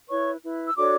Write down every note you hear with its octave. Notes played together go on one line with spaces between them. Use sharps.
E4 B4 C#5 C#6
E4 B4
E6
D4 F#4 A4 C#5 D5 D6